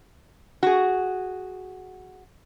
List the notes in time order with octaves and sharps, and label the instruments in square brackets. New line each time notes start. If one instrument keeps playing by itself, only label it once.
[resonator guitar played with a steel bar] F#4 G#4